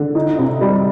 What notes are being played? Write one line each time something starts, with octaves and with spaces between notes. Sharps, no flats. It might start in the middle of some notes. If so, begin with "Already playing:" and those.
Already playing: D3
D#4
C3
G3